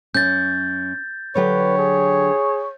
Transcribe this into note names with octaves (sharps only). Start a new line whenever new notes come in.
F#2 C#4 G6 A6
D3 F#3 G4 B4 C#5
G#4